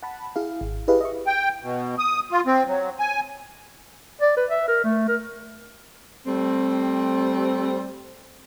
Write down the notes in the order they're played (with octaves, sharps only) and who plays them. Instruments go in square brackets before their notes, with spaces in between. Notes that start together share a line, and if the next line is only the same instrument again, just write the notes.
[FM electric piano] F#5 A5 B5
E4 G#4 F5
G#1
E4 G4 G#4 B4 D#5 F5
D#5 E5 C#6
[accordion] G5
B2
D#6
F4
C4
F#3
G#5
[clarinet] D5
B4
E5
A#4
A3
A#4
[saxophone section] G3 A3 C4